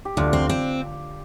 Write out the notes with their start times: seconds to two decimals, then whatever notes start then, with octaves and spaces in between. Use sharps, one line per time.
0.05 G4
0.17 D2 D4 F4
0.33 C4
0.49 C4